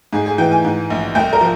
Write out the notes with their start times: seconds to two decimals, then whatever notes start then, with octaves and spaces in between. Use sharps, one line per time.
0.13 G#2 G#4
0.26 G#4
0.38 E3 G5
0.52 G#5
0.65 G#2
0.90 A#1
1.15 C2 G5
1.33 A#4
1.41 F3